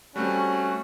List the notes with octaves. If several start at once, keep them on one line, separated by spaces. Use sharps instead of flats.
G3 A3 C4 C#4 F#4